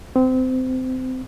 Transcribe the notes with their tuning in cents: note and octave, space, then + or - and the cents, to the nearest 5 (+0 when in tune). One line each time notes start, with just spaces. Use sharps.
C4 -25